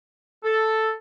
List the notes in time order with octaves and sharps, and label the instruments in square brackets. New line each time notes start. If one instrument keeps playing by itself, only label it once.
[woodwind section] A4